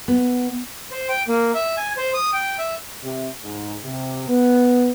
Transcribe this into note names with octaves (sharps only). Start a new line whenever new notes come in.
B3
C5
G5
A#3
E5
G#5
C5
D#6
G5
E5
C3
G#2
C3
B3